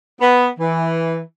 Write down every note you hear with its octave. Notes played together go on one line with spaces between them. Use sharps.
B3
E3